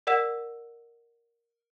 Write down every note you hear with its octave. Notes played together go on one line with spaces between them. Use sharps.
A#4 D5 F#5 E6 E7